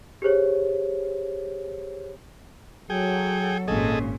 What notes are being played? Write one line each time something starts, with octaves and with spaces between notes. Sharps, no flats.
G4 G#4 C5 C#5
F#3 G#4 A4 G5
G#1 A#2 C#4 G#4 A4 D#5